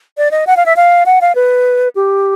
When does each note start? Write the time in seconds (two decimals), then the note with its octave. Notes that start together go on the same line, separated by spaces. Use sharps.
0.18 D5
0.31 D#5
0.47 F#5
0.57 F5
0.66 E5
0.76 F5
1.06 F#5
1.21 F5
1.35 B4
1.96 G4